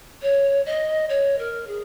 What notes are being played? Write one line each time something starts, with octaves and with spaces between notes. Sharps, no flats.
C#5
D#5
C#5
A#4
G#4